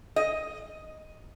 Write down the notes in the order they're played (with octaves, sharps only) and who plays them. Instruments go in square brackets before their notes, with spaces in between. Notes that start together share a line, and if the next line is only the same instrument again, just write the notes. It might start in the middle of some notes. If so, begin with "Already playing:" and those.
[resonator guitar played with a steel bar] D#5